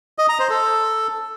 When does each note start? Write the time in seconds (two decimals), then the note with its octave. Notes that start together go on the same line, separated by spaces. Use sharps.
0.18 D#5
0.29 A#5
0.39 C5
0.50 A4